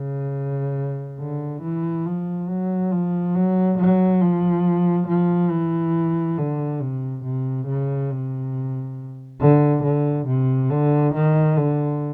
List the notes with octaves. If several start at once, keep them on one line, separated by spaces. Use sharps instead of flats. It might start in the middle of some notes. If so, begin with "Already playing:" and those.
Already playing: C#3
D3
E3
F3
F#3
F3
F#3
F#3
F3
F3
E3
D3
C3
C3
C#3
C3
D3
D3
C3
D3
D#3
D3